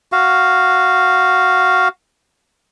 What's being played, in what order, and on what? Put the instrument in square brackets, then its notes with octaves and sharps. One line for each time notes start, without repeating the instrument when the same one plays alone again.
[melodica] F#4 F5